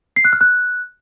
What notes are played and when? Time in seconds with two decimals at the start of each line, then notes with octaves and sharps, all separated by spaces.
0.16 C7
0.25 F#6
0.33 F6
0.41 F#6